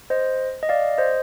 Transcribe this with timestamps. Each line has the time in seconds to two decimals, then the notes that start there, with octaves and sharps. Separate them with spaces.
0.10 C5 D#5
0.63 D#5
0.69 D5 F5
0.98 C5 D#5